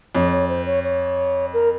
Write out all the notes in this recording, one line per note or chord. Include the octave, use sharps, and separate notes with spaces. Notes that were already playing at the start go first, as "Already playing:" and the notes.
F2 C#5
C#5
C5
C#5
C#5
A#4